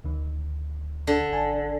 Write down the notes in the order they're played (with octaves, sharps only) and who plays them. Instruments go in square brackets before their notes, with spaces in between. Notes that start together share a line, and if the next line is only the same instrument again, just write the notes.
[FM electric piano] D2 D#3
[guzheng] D3
[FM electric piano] G#1 G#5 A5